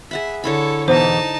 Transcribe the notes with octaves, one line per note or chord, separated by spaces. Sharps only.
G#4 E5 F#5 B5
D3 E4 A4 C#5 B5
E2 B2 E3 D#4 C5 A5